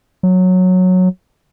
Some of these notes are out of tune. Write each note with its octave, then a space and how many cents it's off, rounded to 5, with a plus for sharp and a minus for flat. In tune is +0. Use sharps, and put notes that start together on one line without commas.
F#3 -10